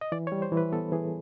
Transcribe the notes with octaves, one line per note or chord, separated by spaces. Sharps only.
D#5
E3 D5
C#5
G3
C5
E3
B4
B3 A4
E3 G#4